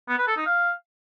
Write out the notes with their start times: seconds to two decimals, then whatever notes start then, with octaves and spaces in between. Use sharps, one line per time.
0.08 B3
0.18 B4
0.27 A4
0.37 D#4
0.46 F5